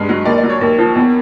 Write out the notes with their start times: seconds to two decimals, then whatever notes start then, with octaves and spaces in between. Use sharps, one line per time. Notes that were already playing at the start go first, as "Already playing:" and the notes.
Already playing: G2 G#3
0.09 F#3
0.25 D#2 D5
0.38 D5
0.43 F#3
0.49 C#5
0.61 D#2
0.79 F3
0.95 E2